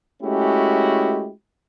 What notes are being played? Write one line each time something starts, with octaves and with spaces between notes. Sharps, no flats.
G#3 A3 C#4 E4 F#4 G4